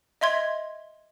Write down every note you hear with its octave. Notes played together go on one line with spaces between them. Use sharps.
D#5 E5 C6 G#6